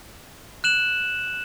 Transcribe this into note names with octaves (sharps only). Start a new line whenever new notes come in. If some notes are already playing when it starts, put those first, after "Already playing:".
F#6 E7 F#7